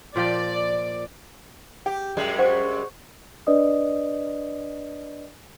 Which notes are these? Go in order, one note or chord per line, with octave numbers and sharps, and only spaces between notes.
A#2 F3 D5 G5
G4 G5
F#2 G3 G#3
C5 F#5 C#6
D4 B4 D5 D#5 D#6